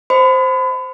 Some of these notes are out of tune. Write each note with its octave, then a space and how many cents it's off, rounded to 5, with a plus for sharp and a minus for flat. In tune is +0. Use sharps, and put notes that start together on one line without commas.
C5 +0 D#5 -15 B5 +35